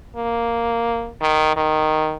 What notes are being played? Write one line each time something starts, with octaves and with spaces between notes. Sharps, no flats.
A#3
D#3
D#3